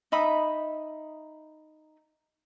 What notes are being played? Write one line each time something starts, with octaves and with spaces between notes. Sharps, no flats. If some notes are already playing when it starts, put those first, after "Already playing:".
D#4 E5 B5 D#6